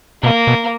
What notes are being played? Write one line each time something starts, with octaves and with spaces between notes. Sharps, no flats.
B2 A#3
B2